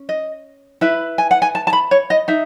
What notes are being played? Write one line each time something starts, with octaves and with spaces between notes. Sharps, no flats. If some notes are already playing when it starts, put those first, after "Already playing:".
Already playing: C#4
D#5
E4 B4 E5
G#5
F#5
G#5
A5
A5
B5
C#5
D#5
D#4 E5